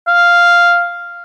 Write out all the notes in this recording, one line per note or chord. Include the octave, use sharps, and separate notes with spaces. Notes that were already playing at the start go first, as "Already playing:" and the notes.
F5